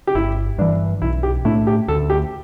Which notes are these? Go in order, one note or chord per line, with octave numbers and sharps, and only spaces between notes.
G4
G1 E4
G2 E3 D4
B1 E4
G4
A2 A3 D4 E4
G4
D2 A4
G4